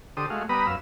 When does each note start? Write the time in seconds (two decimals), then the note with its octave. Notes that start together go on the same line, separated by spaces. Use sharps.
0.17 D3 G4 A4 C5 D#6
0.30 G#3 A3 F#4 F5
0.49 G3 B3 B4 A#5 B5 D#6
0.67 F#2 B4 F5 E6